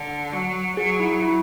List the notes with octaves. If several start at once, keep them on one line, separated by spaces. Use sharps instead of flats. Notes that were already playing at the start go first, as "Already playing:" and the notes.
Already playing: D3
F#3
F#3 G#4
E4
E4